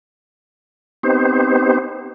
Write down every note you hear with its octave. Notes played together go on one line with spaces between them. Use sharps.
B3 C4 D#4 G4 C5